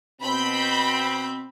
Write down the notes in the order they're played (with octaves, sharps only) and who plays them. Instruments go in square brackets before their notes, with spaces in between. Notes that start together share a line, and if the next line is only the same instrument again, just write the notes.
[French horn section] B2 C4 [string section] B5 G6